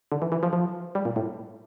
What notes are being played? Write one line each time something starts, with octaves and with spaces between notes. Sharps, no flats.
D3
E3
E3
F3
F3
G3
A#2
A2